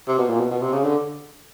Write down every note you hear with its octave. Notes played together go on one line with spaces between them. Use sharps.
C3
B2
A#2
B2
B2
C3
C#3
D3